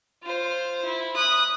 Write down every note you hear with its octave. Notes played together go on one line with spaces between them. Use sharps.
F4 C5
E4
D#6 F#6